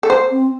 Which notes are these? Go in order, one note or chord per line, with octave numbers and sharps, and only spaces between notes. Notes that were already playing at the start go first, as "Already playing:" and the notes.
A4
C5
C4